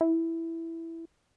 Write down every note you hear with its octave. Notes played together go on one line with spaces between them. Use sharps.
E4